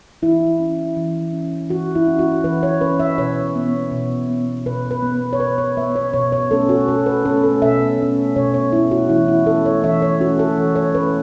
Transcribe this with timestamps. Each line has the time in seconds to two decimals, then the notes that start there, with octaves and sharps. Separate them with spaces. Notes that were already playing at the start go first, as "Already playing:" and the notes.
0.22 E3 E4
0.60 C#4
0.97 E3
1.33 C#4
1.70 E3 F#4
1.95 E4
2.07 C#4
2.19 F#4
2.44 E3 B4
2.63 C#5
2.81 C#4 B4
3.00 E5
3.18 B2 C#5
3.55 B3
3.92 B2
4.30 B3
4.66 B2 B4
4.91 B4
5.03 B3
5.33 C#5
5.40 B2 B4
5.58 C#5
5.77 B3 E5
5.96 C#5
6.13 B2 C#5
6.32 C#5
6.51 A3 C#4 A4
6.69 F#4
6.88 B2 A4
7.06 B4
7.25 A3 C#4 A4
7.43 A4
7.62 B2 E5
7.99 A3 C#4
8.36 B2 C#5
8.54 C#5
8.72 A3 C#4 E4
8.91 F#4
9.09 E3 E4
9.28 E4
9.46 A3 A4
9.49 C#4
9.66 C#5
9.84 E3 E5
10.02 C#5
10.20 A3 C#4 F#4
10.39 A4
10.58 E3
10.76 C#5
10.94 A3 C#4 B4